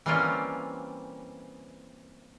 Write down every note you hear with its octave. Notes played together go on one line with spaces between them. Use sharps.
E3 G3 A#3 C4 C#4 F4